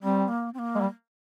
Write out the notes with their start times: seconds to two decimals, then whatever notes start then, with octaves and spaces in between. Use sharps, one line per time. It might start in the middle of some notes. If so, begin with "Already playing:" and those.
0.03 G3 C4
0.28 A#3
0.54 C4
0.59 A#3
0.75 G#3
0.81 G3